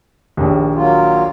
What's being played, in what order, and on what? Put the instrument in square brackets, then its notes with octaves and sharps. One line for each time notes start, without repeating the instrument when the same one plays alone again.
[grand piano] A#1 D#2
[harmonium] F#3 A#3 F4